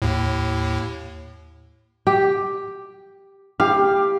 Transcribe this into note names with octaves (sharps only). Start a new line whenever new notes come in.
D#2 A2
G4
G4 F5